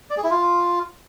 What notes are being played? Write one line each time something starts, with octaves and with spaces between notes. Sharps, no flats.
D5
G#4
E4
F4